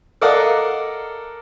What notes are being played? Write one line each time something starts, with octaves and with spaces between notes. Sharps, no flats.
A4 A#4 D5 D#5 F5 F#5